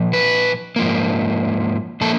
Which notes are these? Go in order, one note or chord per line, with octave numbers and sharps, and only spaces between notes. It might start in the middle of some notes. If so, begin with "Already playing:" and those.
Already playing: A#2 F3
B4
G#2 F3 A#3
A#2 F3 A#3 A4